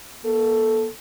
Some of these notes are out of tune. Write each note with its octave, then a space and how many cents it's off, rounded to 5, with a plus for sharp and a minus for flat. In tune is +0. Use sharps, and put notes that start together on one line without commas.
A#3 +40 A4 +0